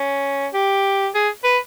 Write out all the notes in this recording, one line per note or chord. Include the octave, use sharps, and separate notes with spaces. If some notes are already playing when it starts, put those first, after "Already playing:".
Already playing: C#4
G4
G#4
B4